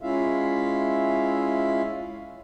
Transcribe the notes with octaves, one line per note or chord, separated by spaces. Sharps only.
G#3 C#4 E4 F4 E5 F5